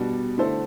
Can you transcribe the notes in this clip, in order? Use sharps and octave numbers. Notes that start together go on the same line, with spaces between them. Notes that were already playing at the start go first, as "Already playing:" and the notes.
Already playing: B2 G3 D4 F#4
D3 A3 E4 A4 C5